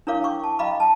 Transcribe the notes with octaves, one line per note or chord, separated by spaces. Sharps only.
D4 E4 A#4 C#5 F5 D6
G5 C#6 D6
A5
D#5 F5 G5 A#5 B5 D6
A5